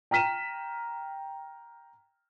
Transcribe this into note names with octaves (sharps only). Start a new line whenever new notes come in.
G5 A#5 F6 B6 D#7 E7